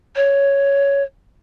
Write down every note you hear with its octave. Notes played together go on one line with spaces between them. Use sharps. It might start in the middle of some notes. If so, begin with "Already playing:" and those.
C#5